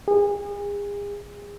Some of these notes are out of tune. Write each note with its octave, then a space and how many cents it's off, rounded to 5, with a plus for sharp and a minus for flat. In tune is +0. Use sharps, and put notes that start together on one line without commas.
G#4 -35